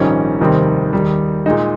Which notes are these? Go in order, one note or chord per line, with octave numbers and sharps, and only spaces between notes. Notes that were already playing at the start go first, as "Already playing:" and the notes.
Already playing: A#1 G#2 D#3 G3 C#4
F1 D#2 D#3 G3 C4
D#2 D#3 G3
A#2 G#3 D#4